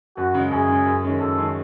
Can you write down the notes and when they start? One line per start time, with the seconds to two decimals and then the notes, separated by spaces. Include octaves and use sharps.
0.17 F#2 F#4
0.34 C#3 G#3
0.51 F#2 G#4
0.69 C#3 G#3
0.86 F#2
1.03 D#3 G#3 C#4 G#4
1.20 F#2 A4
1.38 D#3 G#3 C#4 G#4